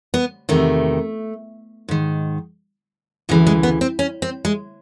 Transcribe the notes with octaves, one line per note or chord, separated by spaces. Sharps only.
B3
E2 C3 D#3 A3
G#2 D#3
D2 C#3 E3 G#3
G#3
B3
C4
C#4
C4
G#3